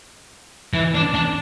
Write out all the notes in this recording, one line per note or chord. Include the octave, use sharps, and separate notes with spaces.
E3
D4
D4